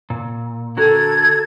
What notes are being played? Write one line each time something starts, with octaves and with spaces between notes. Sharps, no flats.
A#2
D3 F#4 A4 A#4 G#6